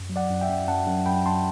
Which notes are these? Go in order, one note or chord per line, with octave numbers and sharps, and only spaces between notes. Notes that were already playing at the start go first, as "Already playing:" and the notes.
Already playing: F#2
F#3
D5 F#5
F#2
E5 G5
F#2
F#2 F#5 A5
F#2
F#2 G5 B5
F#2 A5 C6